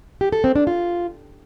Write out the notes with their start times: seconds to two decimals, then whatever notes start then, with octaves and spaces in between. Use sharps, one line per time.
0.21 G4
0.32 A4
0.44 C4
0.56 D4
0.67 F4